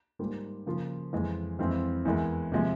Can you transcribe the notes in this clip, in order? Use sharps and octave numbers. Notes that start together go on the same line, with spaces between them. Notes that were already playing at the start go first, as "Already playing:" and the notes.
G#2 G3 A#3 F4
C#3 F3 A#3 F4
F2 E3 G#3
F2 E3 G#3 C4 E4
E2 E3 G#3 E4 A#4
C3 F3 G#3